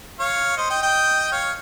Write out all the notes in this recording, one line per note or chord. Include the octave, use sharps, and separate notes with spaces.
C#5 F5
C5 D#5
D#5 G5
D#5 G5
C#5 F5